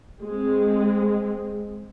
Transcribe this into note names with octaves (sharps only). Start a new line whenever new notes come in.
G#3 C4